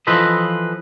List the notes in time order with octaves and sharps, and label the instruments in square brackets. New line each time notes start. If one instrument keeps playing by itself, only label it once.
[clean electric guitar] E3 F3 A4 B4 C5 D#5